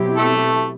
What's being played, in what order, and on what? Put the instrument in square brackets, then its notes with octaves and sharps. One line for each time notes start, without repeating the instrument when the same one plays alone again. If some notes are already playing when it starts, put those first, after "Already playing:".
Already playing: [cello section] B2 F#3 C4 E4 G4
[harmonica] A3 A4